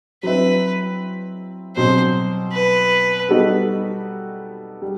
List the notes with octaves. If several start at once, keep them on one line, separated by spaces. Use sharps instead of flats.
F#3 C4 E4 B4
B2 F#3 C4 C5
B4
G3 B3 D#4 F#4 A4
G3